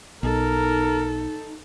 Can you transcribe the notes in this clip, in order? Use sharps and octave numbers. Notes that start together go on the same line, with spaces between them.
B1 D#4 A4 A#4